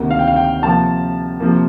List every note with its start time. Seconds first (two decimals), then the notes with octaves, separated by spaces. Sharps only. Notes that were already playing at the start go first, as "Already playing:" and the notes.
Already playing: D2 C3 D#3 A#3
0.11 F5
0.19 G5
0.28 F5
0.36 G5
0.62 C3 F3 A#3 A5
1.40 C3 F3 A#3